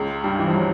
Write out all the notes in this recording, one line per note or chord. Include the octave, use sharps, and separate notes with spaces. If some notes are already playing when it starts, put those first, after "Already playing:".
Already playing: C#2 C#3
G2 G3
E3
F3
F#3